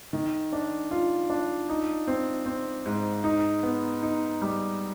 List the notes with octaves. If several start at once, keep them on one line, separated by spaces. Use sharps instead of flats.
D#3
D4
F4
D4
D#4
C4
C4
G#2
D#4
B3
D#4
G3